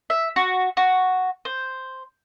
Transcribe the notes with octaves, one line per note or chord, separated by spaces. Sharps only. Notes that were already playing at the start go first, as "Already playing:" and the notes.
E5
F#4
F#4
C5